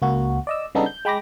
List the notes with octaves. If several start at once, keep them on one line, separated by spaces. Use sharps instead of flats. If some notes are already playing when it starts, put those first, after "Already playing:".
C#2 A#3 F#4
D5 D#5 E6
C#3 G3 B3 D4 D#4 A4
G6
G#3 G5 B5 D6 A#6